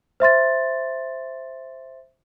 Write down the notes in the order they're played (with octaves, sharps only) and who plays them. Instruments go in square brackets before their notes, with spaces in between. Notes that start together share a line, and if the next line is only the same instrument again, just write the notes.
[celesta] C5 E5 C6 A6